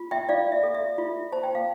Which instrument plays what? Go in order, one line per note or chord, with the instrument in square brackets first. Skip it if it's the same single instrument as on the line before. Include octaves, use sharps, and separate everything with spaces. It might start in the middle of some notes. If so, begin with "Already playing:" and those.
Already playing: [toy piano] F4
E5 G5
F4 D5 F5
E5
A4
E5
F4
C5 A5
G5
F5